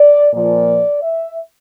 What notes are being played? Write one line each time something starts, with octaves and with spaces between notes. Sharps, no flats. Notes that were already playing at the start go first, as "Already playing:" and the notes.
Already playing: D5
A#2 F3 D5
E5